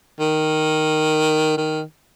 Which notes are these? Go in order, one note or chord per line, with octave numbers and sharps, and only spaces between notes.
D#3
D#3